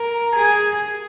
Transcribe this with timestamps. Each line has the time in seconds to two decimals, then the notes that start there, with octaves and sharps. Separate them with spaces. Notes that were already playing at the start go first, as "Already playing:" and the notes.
Already playing: A#4
0.36 G#4